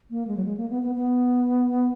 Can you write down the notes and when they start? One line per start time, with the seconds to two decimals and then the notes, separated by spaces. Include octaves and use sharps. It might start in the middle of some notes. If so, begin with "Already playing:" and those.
0.10 A#3
0.27 G#3
0.37 F#3
0.45 G#3
0.57 A#3
0.70 B3
0.82 B3
0.95 B3